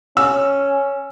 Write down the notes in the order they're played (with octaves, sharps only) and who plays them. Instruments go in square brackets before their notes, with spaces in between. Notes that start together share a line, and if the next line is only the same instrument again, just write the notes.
[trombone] C#4 [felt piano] E6